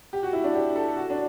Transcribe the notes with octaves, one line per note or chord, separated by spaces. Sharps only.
G4
F#4
E4
D4
G4
A4
F#4
D4